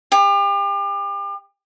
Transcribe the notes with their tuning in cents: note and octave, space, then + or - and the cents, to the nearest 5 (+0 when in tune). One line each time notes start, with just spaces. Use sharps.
G4 +35